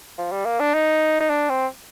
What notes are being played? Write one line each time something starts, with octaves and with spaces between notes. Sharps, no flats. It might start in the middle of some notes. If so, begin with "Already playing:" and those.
F3
G3
A#3
D4
D#4
D#4
D4
C4